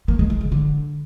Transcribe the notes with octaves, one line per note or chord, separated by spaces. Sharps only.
A#3
G#3
G#3
C#3
D3